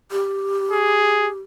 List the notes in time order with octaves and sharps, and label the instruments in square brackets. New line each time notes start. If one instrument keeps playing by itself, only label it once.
[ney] G4
[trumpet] G#4